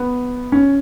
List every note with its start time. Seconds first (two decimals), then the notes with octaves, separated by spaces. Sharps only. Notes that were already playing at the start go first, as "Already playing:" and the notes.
Already playing: B3
0.52 C#4